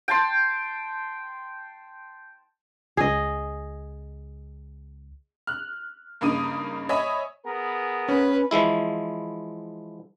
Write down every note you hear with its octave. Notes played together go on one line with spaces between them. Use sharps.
G5 A5 C6
C#2 G#4 D#5
F6 F#6
G2 C#3 A#3 D#4 D#6 D#7
C#5 D#5 E5 G#5 B5 D#6
B3 G#4 A#4
C#4 B4
E3 F3 G#3 E4